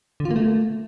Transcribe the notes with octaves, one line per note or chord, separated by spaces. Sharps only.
D3
F4
A#3
A3